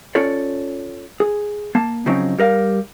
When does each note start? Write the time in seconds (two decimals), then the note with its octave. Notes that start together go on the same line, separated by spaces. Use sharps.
0.15 C#4 F4 A4 C#5 D5
1.20 G#4
1.75 A#3 A5
2.06 C#3 F3 F#3 C4 C#4 D#4
2.39 G3 A#4 D#5 F5